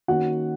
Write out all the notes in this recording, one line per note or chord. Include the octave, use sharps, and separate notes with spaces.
D#3 A#3 C#4 F#4 F#5